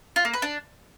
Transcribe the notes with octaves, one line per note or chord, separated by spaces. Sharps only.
F4
A#3
B4
D4